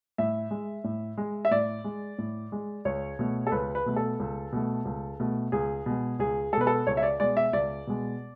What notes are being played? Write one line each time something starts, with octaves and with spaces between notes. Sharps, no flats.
A2 E5
G#3
A2
G#3
E5
A2 D5
G#3
A2
G#3
C#2 C#5
B2 A3
A4
C#2 B4
B4
B2 A3
A4
C#2
B2 A3
C#2
B2 A3
C#2 G#4
B2 G#3
C#2 G#4
B2 G#3 A4 B4
A4
C#2 C#5
E5
D5
B2 G#3 D5
E5
C#2 D5
B2 G#3